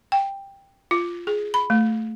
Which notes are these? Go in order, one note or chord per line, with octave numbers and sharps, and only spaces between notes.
G5
F4
G#4
B5
A3